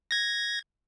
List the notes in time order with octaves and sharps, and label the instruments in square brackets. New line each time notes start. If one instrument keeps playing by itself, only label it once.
[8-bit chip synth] G#6 A#6